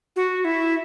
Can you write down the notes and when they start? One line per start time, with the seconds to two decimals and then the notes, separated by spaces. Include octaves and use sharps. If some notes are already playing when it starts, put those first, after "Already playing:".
0.16 F#4
0.45 E4